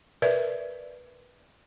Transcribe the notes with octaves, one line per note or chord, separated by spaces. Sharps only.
A#4 B4 D5 E5